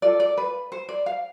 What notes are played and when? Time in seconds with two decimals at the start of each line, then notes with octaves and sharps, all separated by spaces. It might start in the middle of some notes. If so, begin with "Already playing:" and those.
0.02 F4 A4 D5
0.20 D5
0.37 B4
0.72 C5
0.89 D5
1.06 F5